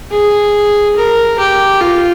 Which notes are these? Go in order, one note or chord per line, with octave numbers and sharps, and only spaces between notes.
G#4
A#4
G4
F4